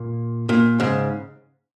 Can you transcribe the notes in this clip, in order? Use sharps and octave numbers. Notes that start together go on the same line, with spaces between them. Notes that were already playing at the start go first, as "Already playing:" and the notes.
Already playing: A#2
A#2
G#2 C#3